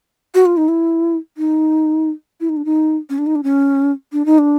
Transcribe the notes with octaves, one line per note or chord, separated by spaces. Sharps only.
F#4
F4
D#4
E4
D#4
E4
D#4
D4
D#4
C#4
D4
D#4
D4
C#4
D4
D#4
D4